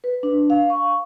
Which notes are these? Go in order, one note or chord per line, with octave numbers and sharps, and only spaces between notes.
B4
D4
F5
C#6